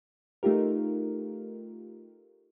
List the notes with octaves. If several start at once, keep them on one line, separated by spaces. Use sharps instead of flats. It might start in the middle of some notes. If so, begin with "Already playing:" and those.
A3 D#4 F4 G4 A#4